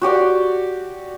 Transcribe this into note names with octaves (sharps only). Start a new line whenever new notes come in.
F#4 G4 D5 F#5